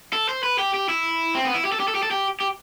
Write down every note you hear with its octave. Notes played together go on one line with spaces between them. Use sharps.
A4
C5
B4
G4
G4
E4
C4
B3
E4
G4
A4
G4
A4
G4
A4
G4
G4